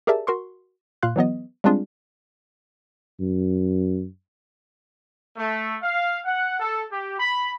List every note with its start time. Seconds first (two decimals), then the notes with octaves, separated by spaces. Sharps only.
0.07 G4 G#4 A#4 D5 E5 A5
0.27 F#4 A#4 C6 C#6
1.03 A#2 F5 C6 F#6
1.16 E3 F#3 B3 D#5
1.64 G3 G#3 C4 D4 F4 G#4
3.20 F#2
5.37 A3
5.81 F5
6.25 F#5
6.59 A4
6.90 G4
7.18 B5